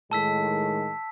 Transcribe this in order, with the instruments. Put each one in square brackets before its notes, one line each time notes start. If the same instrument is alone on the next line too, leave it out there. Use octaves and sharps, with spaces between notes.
[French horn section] A2 D#3 G#3 [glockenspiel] A5 E6 B6